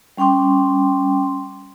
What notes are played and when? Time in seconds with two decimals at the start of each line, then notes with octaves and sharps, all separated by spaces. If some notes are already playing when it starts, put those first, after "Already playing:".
0.17 G3 C#4 G5 C6 D6